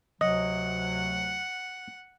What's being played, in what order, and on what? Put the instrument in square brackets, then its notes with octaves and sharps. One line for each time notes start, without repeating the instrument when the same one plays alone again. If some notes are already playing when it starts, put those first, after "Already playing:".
[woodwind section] D2 C3 F#3 [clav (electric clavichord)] D#5 [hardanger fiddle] F#5